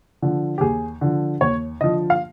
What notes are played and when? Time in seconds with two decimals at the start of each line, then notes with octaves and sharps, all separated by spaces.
0.22 D3 F3
0.58 G4
0.61 D#2 G#4
1.01 D3 F3
1.41 D#2 C#5
1.81 D3 F3 D#5
2.10 F5